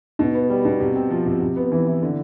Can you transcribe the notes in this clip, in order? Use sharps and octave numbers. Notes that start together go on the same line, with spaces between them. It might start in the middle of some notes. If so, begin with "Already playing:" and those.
B2
B3
G3
B2
C3
C4
F3
C3
C3
B3
E3
E4
D3